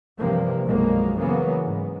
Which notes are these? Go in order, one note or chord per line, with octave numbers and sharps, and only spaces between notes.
G2 C3 E3 F3 A#3
B1 F#2 F3 G#3 A#3
C#3 E3 F#3 A#3 B3
G#2